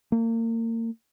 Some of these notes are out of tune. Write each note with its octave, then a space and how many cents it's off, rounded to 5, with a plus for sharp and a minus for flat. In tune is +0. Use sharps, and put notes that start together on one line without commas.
A#3 -35